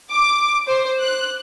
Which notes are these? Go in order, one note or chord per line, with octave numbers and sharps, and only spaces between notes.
D6
C5
F#6